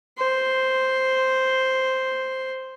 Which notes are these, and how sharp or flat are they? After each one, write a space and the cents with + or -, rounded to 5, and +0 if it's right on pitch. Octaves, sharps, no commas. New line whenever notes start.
C5 +0